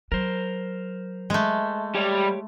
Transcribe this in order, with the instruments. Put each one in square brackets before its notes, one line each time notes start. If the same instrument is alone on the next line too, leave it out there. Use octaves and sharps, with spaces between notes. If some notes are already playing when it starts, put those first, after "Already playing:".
[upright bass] F#3 [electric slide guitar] A#4 C5
[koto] G#3 A3
[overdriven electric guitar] G3 [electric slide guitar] G4 C#5